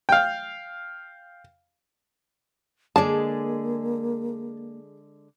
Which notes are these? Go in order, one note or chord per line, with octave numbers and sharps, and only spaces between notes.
F5 G5
D3 G#3 A#3 G#4 D5 A5